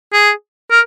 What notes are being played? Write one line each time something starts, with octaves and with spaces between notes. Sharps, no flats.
G#4
A#4